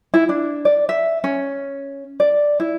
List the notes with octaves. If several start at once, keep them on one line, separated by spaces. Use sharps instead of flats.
E4
D4
D5
E5
C#4
D5
E4